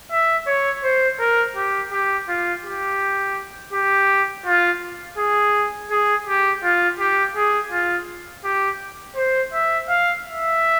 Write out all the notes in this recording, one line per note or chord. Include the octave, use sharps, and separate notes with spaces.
E5
C#5
C5
A#4
G4
G4
F4
G4
G4
F4
G#4
G#4
G4
F4
G4
G#4
F4
G4
C5
E5
F5
E5